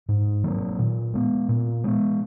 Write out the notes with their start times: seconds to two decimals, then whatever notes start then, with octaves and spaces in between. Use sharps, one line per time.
0.09 G#2
0.44 D#3 F#3 A#3
0.79 A#2
1.13 G#3 B3
1.49 A#2
1.84 G#3 B3